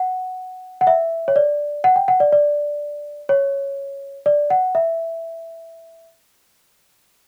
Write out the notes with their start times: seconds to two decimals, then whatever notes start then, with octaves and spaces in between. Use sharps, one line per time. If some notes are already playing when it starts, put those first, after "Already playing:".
Already playing: F#5
0.81 F#5
0.87 E5
1.28 C#5
1.36 D5
1.84 F#5
1.96 G5
2.08 F#5
2.20 D5
2.32 D5
3.29 C#5
4.26 D5
4.50 F#5
4.75 E5